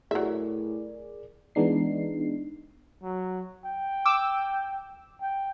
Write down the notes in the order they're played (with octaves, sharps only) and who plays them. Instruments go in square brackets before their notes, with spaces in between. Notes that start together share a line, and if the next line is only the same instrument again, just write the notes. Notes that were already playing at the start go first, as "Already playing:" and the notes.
[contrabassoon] A2 [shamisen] F#3 E5 [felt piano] G#4 A#4 D5
[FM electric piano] E3 G#3 B3 D4 D#4 C7
[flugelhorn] F#3
G5
[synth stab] D6 E6
[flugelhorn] G5